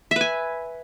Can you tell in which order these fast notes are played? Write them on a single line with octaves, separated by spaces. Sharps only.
E5 B4 G#5